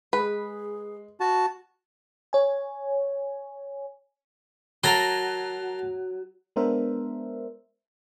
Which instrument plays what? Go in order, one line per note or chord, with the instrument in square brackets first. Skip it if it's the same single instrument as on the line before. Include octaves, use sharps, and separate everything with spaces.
[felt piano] G#3 [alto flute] G#4 [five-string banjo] B4
[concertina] F#4 A5
[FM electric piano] C#5 G#5
[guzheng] F#3 [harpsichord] A#4 A5 C6
[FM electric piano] G#3 B3 D4 A#4 C5 E5